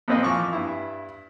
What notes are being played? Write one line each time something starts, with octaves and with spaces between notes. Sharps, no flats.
F2 A#2 C4 B4 D#5
E3 F3 C#6 D6
G2 E4